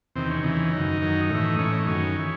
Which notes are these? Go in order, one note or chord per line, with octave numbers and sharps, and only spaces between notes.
E2 C3 D#3 C4
C#4
E2 C#3 E3 D#4
F#2 D#3
F#2 D#3
A2 E3 D#4
A2 E3 C#4
D#4
F#2 D#3 C#4
E3